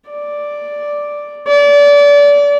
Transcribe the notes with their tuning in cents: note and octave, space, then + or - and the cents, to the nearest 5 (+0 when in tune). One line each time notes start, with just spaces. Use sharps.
D5 +0
D5 -30